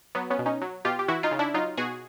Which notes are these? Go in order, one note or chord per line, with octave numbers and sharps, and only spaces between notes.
F#3 B3
B3 C#4
B2
C#4 D#4
F#3
B2 F4 G4
G4
E3 E4 F#4
D#4 F4
C#3
D4 E4
F#3 D#4 F4
B2 F#4 G#4